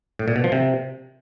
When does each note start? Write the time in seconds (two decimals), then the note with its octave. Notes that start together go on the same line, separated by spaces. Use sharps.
0.19 A2
0.28 A#2
0.36 B2
0.44 F3
0.52 C3